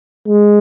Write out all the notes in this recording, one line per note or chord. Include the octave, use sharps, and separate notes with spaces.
G#3